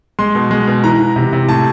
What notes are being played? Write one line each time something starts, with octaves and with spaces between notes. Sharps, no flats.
G#3 C6
B2
G#3
B2
E3 A#5
E3
C3
C3
A2 A5